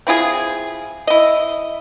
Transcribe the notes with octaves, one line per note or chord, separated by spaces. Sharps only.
C4 E4 F4 G#4
E4 D#5